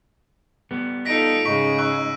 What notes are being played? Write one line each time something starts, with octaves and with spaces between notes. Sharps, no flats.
G3 B3
D#4 F4 A4 A#6 B6 D7
G#2 C#3 G#3 D#4 C#6 B6
C#6 E6 F#6